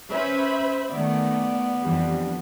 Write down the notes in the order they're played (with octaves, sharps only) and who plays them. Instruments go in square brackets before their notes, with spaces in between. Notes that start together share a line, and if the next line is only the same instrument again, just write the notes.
[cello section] C#4 B4 [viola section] C5 E5 B5
[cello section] D#3 A3 [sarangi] B3 [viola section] D5
[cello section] F2 E3 [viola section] G3 D4